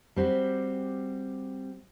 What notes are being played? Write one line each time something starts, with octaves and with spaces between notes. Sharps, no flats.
G3 C4 F#4 G4